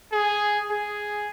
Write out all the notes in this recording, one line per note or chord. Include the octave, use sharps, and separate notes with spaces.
G#4
G#4